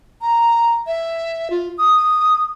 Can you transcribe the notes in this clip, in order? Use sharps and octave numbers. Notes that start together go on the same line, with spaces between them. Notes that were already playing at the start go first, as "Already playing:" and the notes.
A#5
E5
F4
D#6